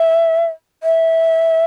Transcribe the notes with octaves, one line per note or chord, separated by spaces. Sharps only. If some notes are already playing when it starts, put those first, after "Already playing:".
Already playing: E5
E5